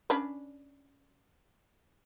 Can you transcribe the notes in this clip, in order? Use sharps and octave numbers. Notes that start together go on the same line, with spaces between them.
C#4 D4 B4